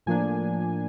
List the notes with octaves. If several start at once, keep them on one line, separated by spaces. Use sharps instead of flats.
A2 F3 A#3 D4 G#5